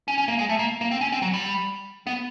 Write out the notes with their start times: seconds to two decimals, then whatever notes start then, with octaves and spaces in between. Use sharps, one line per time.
0.08 C#4
0.18 C#4
0.28 A#3
0.39 G#3
0.49 A3
0.59 A#3
0.81 A#3
0.91 C4
1.01 C#4
1.12 C4
1.22 F#3
1.33 G3
2.07 B3